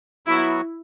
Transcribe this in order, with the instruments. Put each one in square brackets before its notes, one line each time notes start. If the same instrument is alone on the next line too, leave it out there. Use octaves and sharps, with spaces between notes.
[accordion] F#3 B3 F#4 [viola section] E4